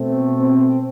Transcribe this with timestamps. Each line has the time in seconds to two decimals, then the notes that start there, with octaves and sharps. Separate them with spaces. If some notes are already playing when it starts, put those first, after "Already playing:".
Already playing: B2 A3 C4
0.38 C4